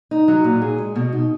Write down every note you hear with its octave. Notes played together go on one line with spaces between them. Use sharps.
D#4
F#3
A#2
G#4
G#3
B2
D#4